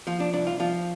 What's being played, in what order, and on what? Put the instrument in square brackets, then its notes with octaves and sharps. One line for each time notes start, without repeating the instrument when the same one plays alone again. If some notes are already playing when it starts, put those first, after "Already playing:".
[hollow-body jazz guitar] F3 F4
D4
C2 D4
F4
F3 F4